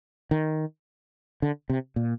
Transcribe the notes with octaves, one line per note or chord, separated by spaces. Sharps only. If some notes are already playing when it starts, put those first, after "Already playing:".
D#3
D3
C3
A#2